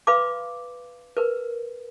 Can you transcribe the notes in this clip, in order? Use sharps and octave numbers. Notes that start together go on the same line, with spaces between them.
B4 F5 B5 C6 D6
A#4 B4